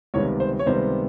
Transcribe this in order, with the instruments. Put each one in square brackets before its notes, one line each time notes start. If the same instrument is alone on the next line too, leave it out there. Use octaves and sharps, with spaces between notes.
[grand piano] C#2 C3 D#3 G3 B3 C#5
C5
C#5
C#2 C3 D#3 G3 B3 C5